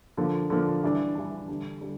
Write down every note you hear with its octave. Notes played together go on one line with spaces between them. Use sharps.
D3 F3 A#3
D3 F3 A#3
E3 G3 D4
E3 G3 D4
D3 G3 D4
D3 G3 D4